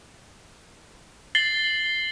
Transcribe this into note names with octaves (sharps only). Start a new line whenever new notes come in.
A6 C7 F#7 G7